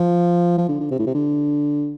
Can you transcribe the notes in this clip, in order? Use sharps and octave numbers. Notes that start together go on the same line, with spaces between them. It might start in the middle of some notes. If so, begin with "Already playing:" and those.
Already playing: F3
F3
D3
D3
C3
A2
C3
D3